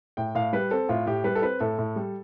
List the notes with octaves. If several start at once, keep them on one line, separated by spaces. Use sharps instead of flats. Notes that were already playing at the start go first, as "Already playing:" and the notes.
A2 G5
A2 F5
G3 B4
C4 A4
A2 F4
A2 G4
G3 B4
A4
C4 B4
A2 A4
A2
G3